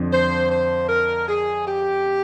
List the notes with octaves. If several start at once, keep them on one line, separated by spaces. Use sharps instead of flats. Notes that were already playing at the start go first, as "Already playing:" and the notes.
Already playing: F2 D3 F3
C5
C5
A#4
G#4
G4